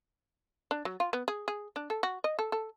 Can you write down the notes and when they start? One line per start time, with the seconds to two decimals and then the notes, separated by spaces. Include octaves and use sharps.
0.71 D4
0.85 F#3
1.00 F4
1.13 B3
1.28 G#4
1.48 G#4
1.76 D4
1.90 A4
2.03 F#4
2.24 D#5
2.39 A4
2.52 A4